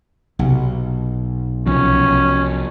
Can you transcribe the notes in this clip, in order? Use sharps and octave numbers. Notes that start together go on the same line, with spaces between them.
B1 C3 A#3
C2 F3 C#4